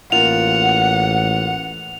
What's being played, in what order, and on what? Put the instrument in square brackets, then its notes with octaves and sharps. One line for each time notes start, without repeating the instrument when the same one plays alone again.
[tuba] A1 [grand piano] A#3 F4 [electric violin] F#5 [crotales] F7